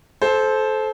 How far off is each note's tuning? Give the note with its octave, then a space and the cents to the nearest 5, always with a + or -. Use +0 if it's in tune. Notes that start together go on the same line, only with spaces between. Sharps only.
A4 -25 C5 +0